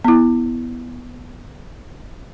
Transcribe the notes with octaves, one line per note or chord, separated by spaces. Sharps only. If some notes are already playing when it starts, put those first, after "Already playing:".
B3 E4